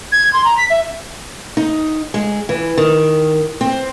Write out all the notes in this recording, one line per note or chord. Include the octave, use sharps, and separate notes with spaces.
G#6
C6
A#5
B6
E5
D#4
G#3
E3
D#3
C4